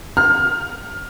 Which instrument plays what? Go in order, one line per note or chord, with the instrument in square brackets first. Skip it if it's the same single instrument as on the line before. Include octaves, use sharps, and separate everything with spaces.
[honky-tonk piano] F6